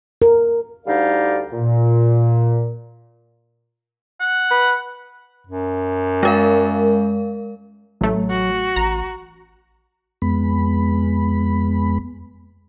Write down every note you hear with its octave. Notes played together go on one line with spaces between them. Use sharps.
A#4
D2 D3 G3 D#4 D5 F5
A#2
F#5
B4
F#2
G#3 A#4 F5
A1 F#3 A3
F#4
A1 A#5
F2 G#3 B3 B5